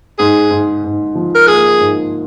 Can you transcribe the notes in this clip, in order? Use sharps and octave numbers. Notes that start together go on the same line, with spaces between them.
G#2 G#4
G#2
G#2
F3
A#4
A#3 G#4
G#2